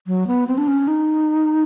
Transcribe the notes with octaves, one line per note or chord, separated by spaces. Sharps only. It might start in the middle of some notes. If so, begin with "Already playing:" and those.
F#3
B3
C4
D4
C#4
D#4